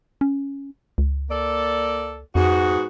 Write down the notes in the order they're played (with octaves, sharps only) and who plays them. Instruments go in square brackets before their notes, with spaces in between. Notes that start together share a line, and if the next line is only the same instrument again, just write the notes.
[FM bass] C#4
C#2
[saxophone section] A#3 A4 D5
[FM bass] F2 [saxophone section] G#2 B3 F#4